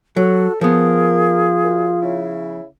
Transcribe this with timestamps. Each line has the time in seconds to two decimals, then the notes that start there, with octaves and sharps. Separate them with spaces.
0.16 F#3 F#4 A4
0.61 F3 B3 F4 G#4 A#4
1.64 F#2
2.02 C#3 E4